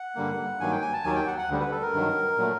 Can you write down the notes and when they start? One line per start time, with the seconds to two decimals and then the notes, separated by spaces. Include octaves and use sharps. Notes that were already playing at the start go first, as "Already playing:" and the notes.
Already playing: F#5
0.15 G2 D3 G3 A#3
0.60 G2 D#3 F#3 A#3 G#5
0.72 G5
0.82 G#5
0.93 A5
1.04 D#2 D#3 F#3 A#3 G#5
1.16 G5
1.27 F#5
1.38 F#5
1.48 D2 D3 G3
1.60 B4
1.71 A4
1.82 A#4
1.94 G2 D#3 F#3
2.37 A#2 F#3 A3